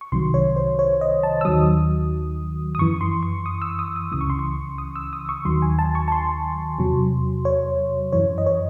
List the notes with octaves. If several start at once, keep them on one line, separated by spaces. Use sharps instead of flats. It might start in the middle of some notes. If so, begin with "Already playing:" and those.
C#6
C2 C3 D#3 F#3 C6
C#5
C5
C#5
D#5
A5
E6
D#2 D#3 F#3 D#6
D#6
F#2 E3 C#6
C6
C#6
D#6
E6
D#6
D#6
C#2 C#3 E3 D#6
C#6
C6
C#6
D#6
E6
D#6
C#6
D#2 D#3 F#3 C6
G#5
A5
C#6
A5
C6
E2 C3 F#3
C#5
F#2 E3 C#5
D#5
C#5